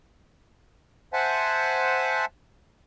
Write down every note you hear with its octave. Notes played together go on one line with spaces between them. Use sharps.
C5 E5 F#5 G#5 A5